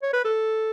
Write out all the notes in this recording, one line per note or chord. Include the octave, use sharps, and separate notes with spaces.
C#5
B4
A4